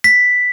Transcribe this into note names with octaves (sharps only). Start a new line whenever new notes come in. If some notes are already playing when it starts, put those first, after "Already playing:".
B6